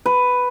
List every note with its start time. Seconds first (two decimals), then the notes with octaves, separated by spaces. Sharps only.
0.06 B4